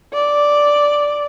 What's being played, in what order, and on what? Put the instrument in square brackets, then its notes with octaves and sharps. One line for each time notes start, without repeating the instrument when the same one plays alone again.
[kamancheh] D5